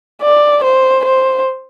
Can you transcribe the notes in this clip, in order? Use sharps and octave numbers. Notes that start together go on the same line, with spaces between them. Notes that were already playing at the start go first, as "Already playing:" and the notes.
D5
C5
C5